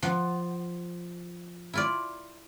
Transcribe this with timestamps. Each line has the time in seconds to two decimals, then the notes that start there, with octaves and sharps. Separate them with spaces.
0.02 F3 F#5
1.73 E4 F4 D5